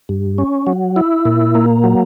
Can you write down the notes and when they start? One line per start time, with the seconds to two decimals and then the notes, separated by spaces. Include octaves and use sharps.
0.09 G2
0.38 C#4
0.67 F#3
0.96 E4
1.25 A#2
1.55 A#3
1.84 F#3